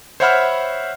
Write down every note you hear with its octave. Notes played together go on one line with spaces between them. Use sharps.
C5 C#5 E5 F#5 B5 F6